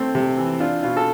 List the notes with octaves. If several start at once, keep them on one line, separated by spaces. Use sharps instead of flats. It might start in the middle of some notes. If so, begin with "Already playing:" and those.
Already playing: A3 C4
C3
E3
D4 F4
B2 F4
A4